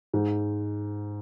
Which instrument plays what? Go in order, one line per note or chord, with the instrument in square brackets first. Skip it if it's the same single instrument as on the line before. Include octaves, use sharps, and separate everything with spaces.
[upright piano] G#2